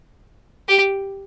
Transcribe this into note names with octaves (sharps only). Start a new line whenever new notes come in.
G4